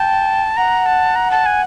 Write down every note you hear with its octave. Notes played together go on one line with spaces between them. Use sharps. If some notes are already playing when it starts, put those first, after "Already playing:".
Already playing: G5 A5
F#5 A#5
A5
A#5
A5
G#5